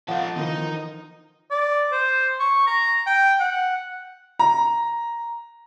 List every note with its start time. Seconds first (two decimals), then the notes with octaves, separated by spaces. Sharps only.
0.08 F3 D#4 A4 F5 F#5 A5
0.37 D#3 E3 D#4
1.51 D5
1.92 C5
2.40 C#6
2.67 A#5
3.06 G5
3.40 F#5
4.39 A#5